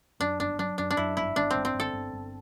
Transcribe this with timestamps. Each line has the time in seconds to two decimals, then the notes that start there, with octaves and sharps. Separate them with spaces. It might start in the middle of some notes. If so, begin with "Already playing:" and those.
0.20 F#2 D4
0.40 G1 D4
0.59 F#3 D4
0.78 F#2 D4
0.91 D4
0.97 F#2 E4
1.17 G1 E4
1.36 G1 D4
1.51 G1 C4
1.65 C4
1.75 G1
1.80 A4
1.93 G1
2.13 G1